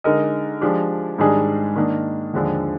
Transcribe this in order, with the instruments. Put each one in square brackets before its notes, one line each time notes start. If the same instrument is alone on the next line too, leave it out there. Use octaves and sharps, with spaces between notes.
[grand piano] D3 G#3 D#4 A#4 D#5
F3 G#3 D4 G4
G#2 D#3 G3 D4 G#4
D#3 A#3 D4
D#2 D3 F3 G#3 D4